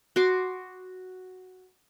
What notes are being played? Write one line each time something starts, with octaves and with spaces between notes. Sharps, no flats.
F#4 C6 D6